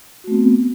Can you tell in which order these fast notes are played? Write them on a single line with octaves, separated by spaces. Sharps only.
F#4 A3 C4 B3